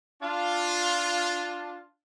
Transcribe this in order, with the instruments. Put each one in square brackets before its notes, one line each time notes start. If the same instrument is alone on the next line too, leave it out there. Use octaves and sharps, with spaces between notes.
[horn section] D4 F4